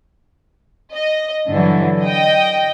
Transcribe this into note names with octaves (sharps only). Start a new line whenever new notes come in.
D#5
G2 D3 E3 F#3
D#5 G5